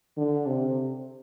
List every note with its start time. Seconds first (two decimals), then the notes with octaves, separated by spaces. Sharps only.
0.17 D3
0.47 C3